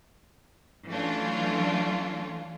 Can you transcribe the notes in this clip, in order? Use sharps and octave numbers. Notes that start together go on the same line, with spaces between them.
E3 F#3 A3 C#4 D4 F4